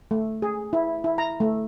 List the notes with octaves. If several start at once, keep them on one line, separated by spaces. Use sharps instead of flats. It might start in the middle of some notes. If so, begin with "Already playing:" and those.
A3
G#4
E4
E4
A#5
A3